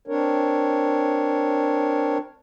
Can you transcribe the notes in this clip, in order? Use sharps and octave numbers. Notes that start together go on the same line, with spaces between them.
C4 D4 A#4 C#5